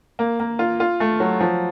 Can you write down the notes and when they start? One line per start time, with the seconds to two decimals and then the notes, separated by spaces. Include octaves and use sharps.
0.19 A#3
0.40 A#3
0.59 F4
0.80 F4
1.00 A3
1.20 F#3
1.40 F3